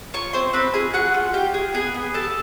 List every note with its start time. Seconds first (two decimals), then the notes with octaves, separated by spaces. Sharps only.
0.14 F4 C#5 C#6
0.33 C4 C5 C6
0.53 C4 B4 B5
0.74 F4 G#4 G#5
0.93 F#4 G#4 F#5
1.14 F4
1.34 F4 G4 G5
1.54 G#4
1.74 B3 G#4 G#5
1.94 B3
2.14 G4 A4 A5